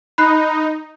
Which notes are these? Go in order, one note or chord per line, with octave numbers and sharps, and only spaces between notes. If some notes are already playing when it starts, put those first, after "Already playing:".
D#4 B5 F#6 C7